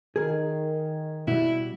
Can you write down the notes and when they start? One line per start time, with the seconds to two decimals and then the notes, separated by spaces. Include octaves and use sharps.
0.16 D#3 G#4 A#4
1.27 B2 G3 E4